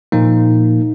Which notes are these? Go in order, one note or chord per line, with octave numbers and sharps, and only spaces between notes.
A#2 F3 A#3 D#4